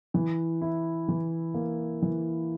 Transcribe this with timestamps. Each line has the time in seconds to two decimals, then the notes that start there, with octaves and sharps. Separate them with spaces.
0.14 E3
0.61 E4
1.08 E3
1.54 A#3
2.02 E3